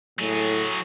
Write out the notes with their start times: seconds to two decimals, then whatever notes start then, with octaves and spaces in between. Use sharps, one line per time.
0.19 A2 F#3 G#4